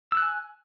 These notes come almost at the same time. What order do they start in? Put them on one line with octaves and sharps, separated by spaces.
E6 F#6 G#5